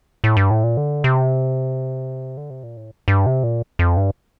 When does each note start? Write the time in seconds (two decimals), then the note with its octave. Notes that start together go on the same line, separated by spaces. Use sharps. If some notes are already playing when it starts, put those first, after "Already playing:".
0.24 A2
0.37 G2
0.51 A2
0.64 A#2
0.77 D3
1.04 C3
2.37 D3
2.50 C3
2.63 A#2
2.77 A2
3.08 G2
3.26 C3
3.44 A#2
3.79 F2
3.97 G2